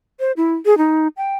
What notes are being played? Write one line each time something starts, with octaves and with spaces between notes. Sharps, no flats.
C5
E4
G#4
D#4
G5